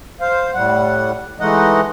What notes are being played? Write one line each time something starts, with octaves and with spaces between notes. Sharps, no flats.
C5 F5
A2 G3 F#5
E3 G#3 A3 D#4 D#5 F#5